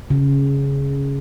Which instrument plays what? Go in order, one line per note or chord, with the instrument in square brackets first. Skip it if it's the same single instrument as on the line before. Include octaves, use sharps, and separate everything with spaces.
[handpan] C#3